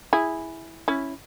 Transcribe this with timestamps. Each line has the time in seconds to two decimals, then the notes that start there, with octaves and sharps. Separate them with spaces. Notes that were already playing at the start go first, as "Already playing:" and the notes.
0.13 E4 G#4
0.88 C#4 E4